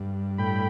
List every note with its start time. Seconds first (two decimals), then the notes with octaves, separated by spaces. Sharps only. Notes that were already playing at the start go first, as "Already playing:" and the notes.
Already playing: G2
0.38 A2 G5 B5